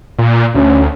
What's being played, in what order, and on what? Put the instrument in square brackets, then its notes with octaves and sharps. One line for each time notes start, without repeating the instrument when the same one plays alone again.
[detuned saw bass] A#2
[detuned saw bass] D2 [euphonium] C#4